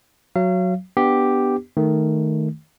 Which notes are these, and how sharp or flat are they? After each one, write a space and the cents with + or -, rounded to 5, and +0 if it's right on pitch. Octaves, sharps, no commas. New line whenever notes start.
F#3 -5 F5 -35
B3 +0 D4 +0 G4 +0
D#3 +0 A3 +0